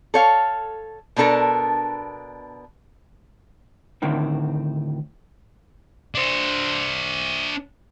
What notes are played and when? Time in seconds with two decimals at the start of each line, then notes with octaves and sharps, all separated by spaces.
0.14 A4 C#5 F5
1.16 B2 B3 D4 A4 A#4
4.02 D2 A2 D3 D#3 C4
6.15 D4 C5